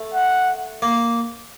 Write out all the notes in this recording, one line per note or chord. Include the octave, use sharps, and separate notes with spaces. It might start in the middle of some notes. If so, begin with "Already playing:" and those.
Already playing: A3
F#5
A#3